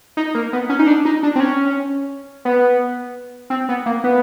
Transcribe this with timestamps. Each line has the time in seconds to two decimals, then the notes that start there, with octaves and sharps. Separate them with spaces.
0.17 D#4
0.35 A#3
0.53 B3
0.70 C#4
0.79 D#4
0.87 D4
1.05 D#4
1.23 D4
1.36 C4
1.40 C#4
2.45 B3
3.50 C4
3.69 B3
3.86 A#3
4.04 B3